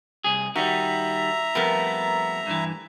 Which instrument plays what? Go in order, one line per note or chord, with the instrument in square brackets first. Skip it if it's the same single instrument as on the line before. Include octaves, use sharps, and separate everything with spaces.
[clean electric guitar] C2 G#4
[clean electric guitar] D#3 G3 [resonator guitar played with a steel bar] F#4 [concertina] E5 A#5
[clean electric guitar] F2 B3 [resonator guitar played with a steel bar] G3 A3 A#4
[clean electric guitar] G2 E3